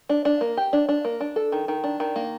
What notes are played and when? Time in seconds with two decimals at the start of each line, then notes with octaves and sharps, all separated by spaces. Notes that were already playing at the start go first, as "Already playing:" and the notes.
0.09 D4
0.25 D4
0.41 A#3
0.57 G4
0.73 D4
0.89 D4
1.05 A#3
1.21 D4
1.36 A4
1.52 D#3
1.68 D#3
1.84 D4
2.00 D#3
2.16 A#3